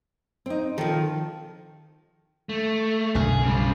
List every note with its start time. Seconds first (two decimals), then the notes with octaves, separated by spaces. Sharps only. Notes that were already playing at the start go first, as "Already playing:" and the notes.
0.46 C4 D#4
0.78 D#3 F3 A4
2.49 A3
3.15 B1 F#2 D3 G#4
3.43 C#3 G3